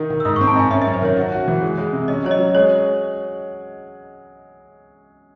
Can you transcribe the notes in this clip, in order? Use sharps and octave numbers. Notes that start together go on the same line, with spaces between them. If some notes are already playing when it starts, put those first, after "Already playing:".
Already playing: D#3 D#4
D#3
E6
G#2 D#6
C4 C#6
A5
G#2 G#5
C#4 E5
F#2 E5
C5
D#3 C#5
F#4 E5
F#4
E3
G#3
G#3
C3
C#4 D#5
F#3 C#5
D#5
F#3
G#3 C#5